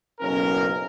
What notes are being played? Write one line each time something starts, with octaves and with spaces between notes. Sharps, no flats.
F#1 B1 C#4 A#4